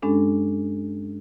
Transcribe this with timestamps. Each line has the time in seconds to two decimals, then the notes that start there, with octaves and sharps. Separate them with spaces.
0.02 G2 G#3 C#4 D4 A4